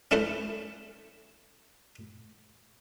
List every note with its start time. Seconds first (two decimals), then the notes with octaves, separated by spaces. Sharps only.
0.11 C#4 E4 A4 B4 C5